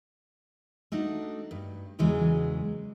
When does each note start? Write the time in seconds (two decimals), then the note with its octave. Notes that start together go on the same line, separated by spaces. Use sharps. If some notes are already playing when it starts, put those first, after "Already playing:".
0.92 A3 D4 D#4 F#4
1.51 G2
1.99 E2 C#3 E3 F#3 G#3